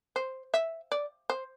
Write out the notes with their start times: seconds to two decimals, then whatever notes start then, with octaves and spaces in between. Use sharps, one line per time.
0.16 C5
0.54 E5
0.92 D5
1.30 C5